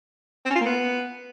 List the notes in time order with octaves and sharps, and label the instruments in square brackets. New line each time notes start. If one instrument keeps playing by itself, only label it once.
[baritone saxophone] C4
C#4
F4
A#3
B3